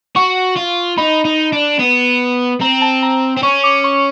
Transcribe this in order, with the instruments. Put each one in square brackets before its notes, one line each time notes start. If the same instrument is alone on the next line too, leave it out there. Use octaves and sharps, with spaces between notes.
[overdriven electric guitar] F#4 [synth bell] C#6
[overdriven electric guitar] F4
[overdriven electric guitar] D#4 [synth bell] B5
[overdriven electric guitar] D#4
D4
B3
[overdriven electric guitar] C4 [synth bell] A#5
[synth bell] A5
A#5
[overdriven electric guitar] C4
[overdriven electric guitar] C#4 [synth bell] C#6
[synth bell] D6
C#6